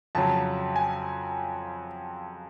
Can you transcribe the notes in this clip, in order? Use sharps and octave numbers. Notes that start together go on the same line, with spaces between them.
F2 C#3 F#3 A5
G#5